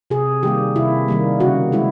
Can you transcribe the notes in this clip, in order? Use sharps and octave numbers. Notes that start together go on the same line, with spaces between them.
C3 G#4
D#3 G3 A#3 G4
C3 E4
D#3 G3 A#3
C#3 F#4
G#3 E4